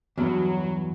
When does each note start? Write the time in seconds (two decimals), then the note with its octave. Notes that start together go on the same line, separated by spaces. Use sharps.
0.18 E2 G2 F#3